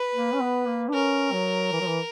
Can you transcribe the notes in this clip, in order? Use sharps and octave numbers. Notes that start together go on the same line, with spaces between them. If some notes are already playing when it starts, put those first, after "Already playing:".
Already playing: B4
A#3
C#4
B3
A#3
D4
C#4 A#4
F#3
E3
F#3
E3